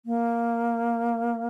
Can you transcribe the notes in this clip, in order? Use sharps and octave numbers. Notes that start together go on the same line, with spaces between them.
A#3